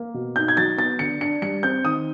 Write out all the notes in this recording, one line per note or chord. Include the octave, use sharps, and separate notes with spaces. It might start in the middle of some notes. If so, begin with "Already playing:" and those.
Already playing: A#3
B2
D#4 G6
G#6
F#3 A6
B3 A6
D3 C#7
D4 C#7
G3 C#7
C4 G6
D#3 D#6